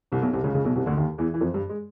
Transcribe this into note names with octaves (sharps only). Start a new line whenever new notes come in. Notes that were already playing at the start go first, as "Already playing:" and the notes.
C2 C3
B1 B2
C2 C3
C#2 C#3
C#2 C#3
B1 B2
C2 C3
D2 D3
D#2 D#3
E2 E3
E3
F2 F3
G2 G3
G#3